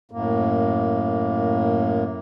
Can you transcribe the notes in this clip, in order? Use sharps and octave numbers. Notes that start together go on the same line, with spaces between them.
F#2 A2 A#3